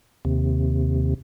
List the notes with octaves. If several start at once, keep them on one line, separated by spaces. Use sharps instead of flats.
D#2 C3